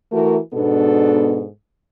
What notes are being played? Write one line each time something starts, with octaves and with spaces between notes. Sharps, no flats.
E3 A3 F#4 A#4
G#2 B2 B3 D4 A4